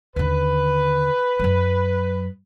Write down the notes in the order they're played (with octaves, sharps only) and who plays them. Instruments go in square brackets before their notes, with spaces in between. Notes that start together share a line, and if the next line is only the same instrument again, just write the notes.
[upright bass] D#2 D3 [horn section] B4
[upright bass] F#2 F#3